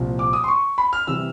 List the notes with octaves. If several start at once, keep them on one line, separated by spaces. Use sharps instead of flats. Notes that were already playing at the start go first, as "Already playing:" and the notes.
Already playing: C2 A#2 F3
D6
D#6
C6
C#6
B5
F6
C3 E3 G3 E6